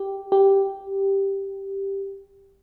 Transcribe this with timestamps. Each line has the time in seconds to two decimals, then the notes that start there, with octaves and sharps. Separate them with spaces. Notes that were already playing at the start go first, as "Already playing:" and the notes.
Already playing: G4
0.32 G4